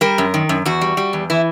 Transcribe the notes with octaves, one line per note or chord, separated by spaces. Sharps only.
G3 A#4
F#2
D#3
F#2
E2 F#4
G3
G3
E2
E3 E4